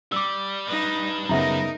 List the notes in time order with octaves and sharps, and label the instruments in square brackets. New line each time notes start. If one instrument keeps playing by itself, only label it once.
[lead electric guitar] G3 [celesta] D6 E6
[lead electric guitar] G3 B4 [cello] D#4
[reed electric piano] F#2 C#3 B3 [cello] D#4 A#4 [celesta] E5 A#5